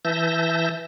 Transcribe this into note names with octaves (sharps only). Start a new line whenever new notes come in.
E3 E5 A5 G6 A#6